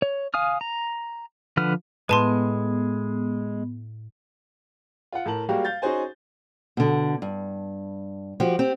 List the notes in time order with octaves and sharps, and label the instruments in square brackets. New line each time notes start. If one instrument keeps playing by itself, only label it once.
[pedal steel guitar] C#5
F5 G#5 D#6 F6
A#5
D3 F3 B4 F#5 F6
[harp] A2 D#7 [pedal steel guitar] G#3 [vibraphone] B3 [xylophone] B4 A5 C6
[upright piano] F4 F#5
A2 A#4 A5 F#7
G3 G#3 A#3 F#4 G4 F5
F5 G6 A6
C#4 D#4 F#4 G#4 C5 G#5
[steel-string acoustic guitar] B2 D3
G2
F3 F#4 G4
C4 G4